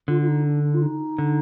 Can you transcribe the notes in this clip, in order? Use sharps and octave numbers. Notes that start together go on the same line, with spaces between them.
D3 F4
F4
D#4
D4
D4
F4
D#4
D3